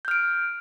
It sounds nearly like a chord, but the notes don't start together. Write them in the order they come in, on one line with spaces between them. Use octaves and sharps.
G6 F6 D7